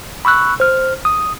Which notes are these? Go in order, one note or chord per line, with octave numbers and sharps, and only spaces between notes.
B5 C#6 E6 F#6
C5 F6
D#6